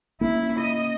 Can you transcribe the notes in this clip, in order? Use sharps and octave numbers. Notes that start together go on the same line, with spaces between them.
A#3 C#4 E4
D#5